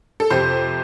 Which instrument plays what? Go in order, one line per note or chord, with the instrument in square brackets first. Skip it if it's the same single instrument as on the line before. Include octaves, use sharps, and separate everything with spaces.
[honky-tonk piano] A4
F2 C3 G4 C5